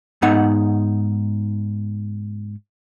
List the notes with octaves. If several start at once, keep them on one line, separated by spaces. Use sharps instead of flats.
G#2 B3 D#4 F#5